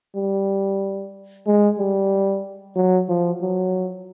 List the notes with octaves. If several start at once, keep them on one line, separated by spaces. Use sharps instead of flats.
G3
G#3
G3
F#3
F3
F#3